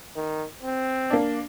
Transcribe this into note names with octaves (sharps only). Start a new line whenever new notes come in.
D#3
C4
A#3 D4